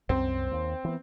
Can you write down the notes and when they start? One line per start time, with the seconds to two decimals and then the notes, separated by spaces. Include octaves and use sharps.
0.09 C2 F#2 C4
0.51 D#2
0.85 E3 B3